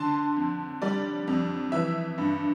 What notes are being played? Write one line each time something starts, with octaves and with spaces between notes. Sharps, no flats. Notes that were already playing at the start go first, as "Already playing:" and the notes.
Already playing: D3 A5 C6
F2
G3 D5
F2
E3 E5
G2